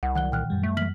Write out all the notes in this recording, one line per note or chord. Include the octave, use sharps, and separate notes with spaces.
C2 F#5
D#3 F#3 F#5 F#6 G7
A#2 D#3 E3 G5 F6 F#6
F#2 G3
A3
E3 F#3 A#3 F6 B6 F#7